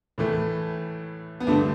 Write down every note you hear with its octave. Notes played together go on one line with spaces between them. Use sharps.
A2 E3 A3
B3
G2 D3 A3 D4